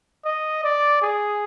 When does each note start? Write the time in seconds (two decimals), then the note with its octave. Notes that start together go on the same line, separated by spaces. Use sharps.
0.25 D#5
0.64 D5
1.02 G#4